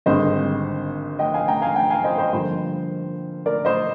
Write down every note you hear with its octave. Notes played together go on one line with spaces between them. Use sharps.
G#1 G2 D3 G#3 C4 C5 D#5
D#5 G5
F5 G#5
G5 A#5
F5 G#5
G5 A#5
F5 G#5
C5 D#5
C5 D#5
G2 D3 F3 A#3 C5
A#4 D5
C5 D#5